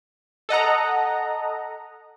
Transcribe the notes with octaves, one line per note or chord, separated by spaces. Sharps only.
A4 D#5 F#5 A#5